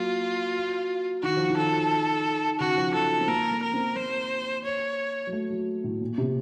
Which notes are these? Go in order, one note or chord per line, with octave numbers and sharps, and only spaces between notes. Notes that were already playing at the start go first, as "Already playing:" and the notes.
Already playing: F#3 A#3 F4
D#3 F#4
F3
D#3
A4
C#3 F#4
F3
F#3 A4
C4
A#3 A#4
A#3
A#4
C4
A#3 C5
C#5
F#3
A3
F#3
A2
A#2
C3